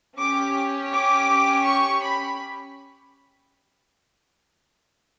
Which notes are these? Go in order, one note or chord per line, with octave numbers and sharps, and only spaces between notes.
C#4 G4 D6
D6
C#6
B5